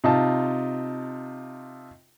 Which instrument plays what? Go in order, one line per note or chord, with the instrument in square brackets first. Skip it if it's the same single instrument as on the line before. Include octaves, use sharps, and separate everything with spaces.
[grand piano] C3 D#4 F4 A5